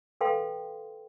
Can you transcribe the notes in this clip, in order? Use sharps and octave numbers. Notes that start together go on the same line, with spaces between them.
A4 B4 F5 G5 C6